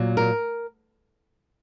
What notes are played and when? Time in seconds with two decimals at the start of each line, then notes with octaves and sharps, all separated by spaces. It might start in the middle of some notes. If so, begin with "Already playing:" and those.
Already playing: A#2 F#3
0.17 A#4